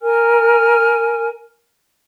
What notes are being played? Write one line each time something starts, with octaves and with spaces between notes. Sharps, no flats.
A#4 G#5 F6